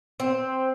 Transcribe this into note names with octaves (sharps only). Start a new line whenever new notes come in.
C4